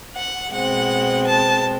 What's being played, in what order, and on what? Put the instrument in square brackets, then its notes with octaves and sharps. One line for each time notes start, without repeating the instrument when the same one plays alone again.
[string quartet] F#5
B2 G#3 C4 F#5
A5